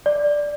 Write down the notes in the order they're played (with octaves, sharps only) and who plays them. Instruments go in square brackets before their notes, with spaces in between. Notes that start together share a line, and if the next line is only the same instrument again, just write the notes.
[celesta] D5